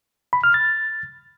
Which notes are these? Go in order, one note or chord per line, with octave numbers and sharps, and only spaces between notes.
B5
F6
A6